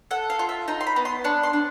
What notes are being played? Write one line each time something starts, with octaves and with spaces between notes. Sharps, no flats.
A4 F#5
F5
F4
E5
D#4 A#5
C6
B5
B3
C6
D4 C#6
C6
D4